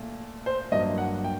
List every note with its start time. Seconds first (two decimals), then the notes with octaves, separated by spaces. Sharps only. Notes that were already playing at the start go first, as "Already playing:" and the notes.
Already playing: A#2 A3
0.46 C5
0.72 G2 F#3 A#3 D#5
0.98 F#5
1.24 G5